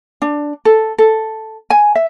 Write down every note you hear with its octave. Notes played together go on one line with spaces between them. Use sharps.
D4
A4
A4
G#5
E5